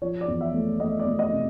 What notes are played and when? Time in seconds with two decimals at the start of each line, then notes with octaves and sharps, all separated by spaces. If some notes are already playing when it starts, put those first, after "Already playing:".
0.02 F3 C#5
0.21 D5
0.28 E2
0.41 E5
0.54 A3
0.80 A3 D#5
1.00 D5
1.06 A3
1.19 D#5
1.32 C3